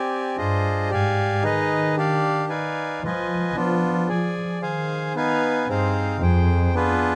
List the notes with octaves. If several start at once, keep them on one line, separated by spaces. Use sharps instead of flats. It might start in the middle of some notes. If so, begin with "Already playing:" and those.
Already playing: C4 G4 D5 G#5
G2 D4 F4 G#4 C5 D#5
G#2 G4 D5 F5 G#5
D#3 D#4 G#4 B4 D#5
D4 G4 D5 F5
D#4 B4 D5 F5 G#5
F3 F4 B4 D#5 G#5
F3 B3 D4 F4
F3 G#4 D5 G#5
D#3 G#4 C5 F5 G#5
B3 D#4 B4 F5 G#5
G2 C4 D#4 G#4 C5 F5
F2 G#4 C5 G5
B3 D4 F4 G#4 B4